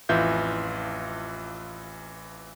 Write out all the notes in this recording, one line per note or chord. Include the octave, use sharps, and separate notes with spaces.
A1 F2 E3 F4 E5 G6